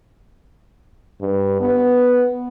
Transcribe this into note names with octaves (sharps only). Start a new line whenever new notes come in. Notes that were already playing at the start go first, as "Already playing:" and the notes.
G2
B3